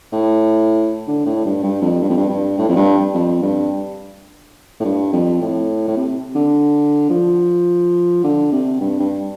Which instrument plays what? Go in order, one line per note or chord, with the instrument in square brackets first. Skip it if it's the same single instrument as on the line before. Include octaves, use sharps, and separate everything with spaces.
[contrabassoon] A2
D3
A2
G2
G2
F2
G2
F2
G2
G2
A2
F2
G2
F2
G2
A2
G2
F2
A2
A2
C3
D3
F3
D3
C3
G2
G2